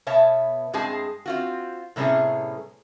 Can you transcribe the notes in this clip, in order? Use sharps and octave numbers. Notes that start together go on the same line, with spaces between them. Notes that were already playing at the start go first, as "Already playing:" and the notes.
B2 B3 C#5 E5 A5
G2 G#3 C4 G#4 A5
C4 F4 F#4
A2 C3 G3 B3 C#4 G#4